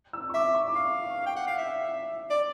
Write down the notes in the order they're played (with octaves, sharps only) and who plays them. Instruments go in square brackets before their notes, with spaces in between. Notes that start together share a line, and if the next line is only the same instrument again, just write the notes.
[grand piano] E6
C#6
[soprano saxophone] E5 [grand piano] D6
[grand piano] C#6
D6
[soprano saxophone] F5 [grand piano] C#6
[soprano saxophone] G5
F#5
F5
E5
D5